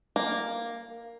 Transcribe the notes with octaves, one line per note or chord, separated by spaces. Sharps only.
A#3